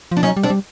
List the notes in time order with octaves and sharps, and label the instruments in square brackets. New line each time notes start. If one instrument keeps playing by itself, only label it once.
[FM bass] F3
[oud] D4
[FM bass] F#3 [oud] C#4 D#4
[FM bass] G3
[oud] C4 D4
[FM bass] G3